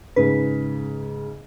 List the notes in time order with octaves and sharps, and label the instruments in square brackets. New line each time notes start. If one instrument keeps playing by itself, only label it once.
[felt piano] G#2 C#3 [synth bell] B4